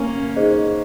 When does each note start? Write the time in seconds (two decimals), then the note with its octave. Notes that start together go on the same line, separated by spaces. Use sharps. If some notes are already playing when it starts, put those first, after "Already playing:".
Already playing: A#3 C#4
0.36 D#4 G#4 C5 D#5